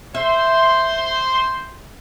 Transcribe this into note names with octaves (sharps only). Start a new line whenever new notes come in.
C5 E5 C6